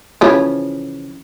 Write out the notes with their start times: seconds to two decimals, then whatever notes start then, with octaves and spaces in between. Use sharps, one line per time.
0.21 C#3 E3 F3